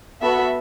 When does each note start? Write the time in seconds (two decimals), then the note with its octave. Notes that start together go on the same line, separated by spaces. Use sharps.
0.22 B3 F#4 A4 E5